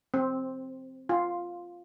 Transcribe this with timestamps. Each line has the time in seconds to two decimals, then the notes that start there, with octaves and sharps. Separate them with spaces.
0.14 C4
1.09 F4